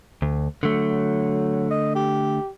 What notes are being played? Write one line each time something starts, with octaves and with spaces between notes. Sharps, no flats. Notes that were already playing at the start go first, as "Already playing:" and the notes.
D2
D3 F#3 A3
D#5
G4